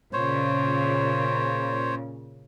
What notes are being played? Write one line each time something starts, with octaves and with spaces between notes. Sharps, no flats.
A#2 C#3 C5 C#5